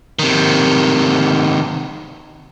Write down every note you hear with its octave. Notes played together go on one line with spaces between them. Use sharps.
C3 D#3